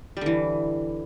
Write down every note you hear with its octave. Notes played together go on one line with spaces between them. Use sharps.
D3 E3 G3